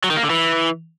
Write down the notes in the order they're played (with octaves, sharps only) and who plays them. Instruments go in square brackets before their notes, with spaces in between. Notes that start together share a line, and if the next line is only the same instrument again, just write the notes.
[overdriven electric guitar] F#3
D#3
A#3
D3
E3